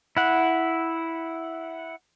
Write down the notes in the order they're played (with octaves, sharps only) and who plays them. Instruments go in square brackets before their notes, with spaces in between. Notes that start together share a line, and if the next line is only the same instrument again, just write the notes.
[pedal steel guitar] E4 F#5